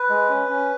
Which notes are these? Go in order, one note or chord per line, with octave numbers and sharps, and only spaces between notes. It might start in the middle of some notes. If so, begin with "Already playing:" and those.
Already playing: B4
G#3
C#4
C#4